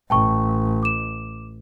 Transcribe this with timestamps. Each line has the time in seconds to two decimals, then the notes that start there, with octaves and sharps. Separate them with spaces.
0.10 A1 G5 A5 C#6
0.83 D6 E7